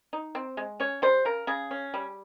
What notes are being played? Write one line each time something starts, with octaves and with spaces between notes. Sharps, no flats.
D#4
C4
G#3
C#4 C#5
G3 C5
C#3 A#4
C#3 G#4
C#4
G3